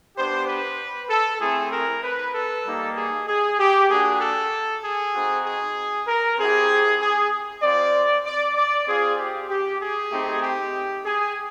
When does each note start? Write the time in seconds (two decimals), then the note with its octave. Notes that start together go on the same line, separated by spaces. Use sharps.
0.17 B3 D4 G4 C5
0.48 B4
1.10 A4
1.41 A3 C4 E4 G#4
1.72 A#4
2.04 B4
2.34 A4
2.66 G3 A#3 D#4 G4
2.97 G#4
3.28 G#4
3.59 G4
3.90 A#3 D4 F#4 G#4
4.21 A4
4.83 G#4
5.15 C4 D#4 F#4
5.45 G#4
6.08 A#4
6.38 C4 E4 G4 G#4
7.01 G#4
7.63 C4 F4 D5
8.26 D5
8.56 D5
8.87 C4 F4 G#4
9.19 G4
9.50 G4
9.81 G#4
10.12 A3 C4 D#4 G4
10.43 G4
11.06 G#4